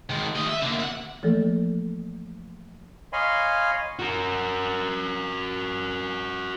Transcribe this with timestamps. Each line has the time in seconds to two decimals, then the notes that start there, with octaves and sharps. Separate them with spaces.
0.10 D#3 G#3
0.35 A3 D#5
0.49 E5
0.62 D3 A#3
0.79 E5 F#5
1.23 E3 F3 A3 A#3 A4
3.13 C#5 D#5 F5 G#5 B5 C6
3.99 F#4 A#4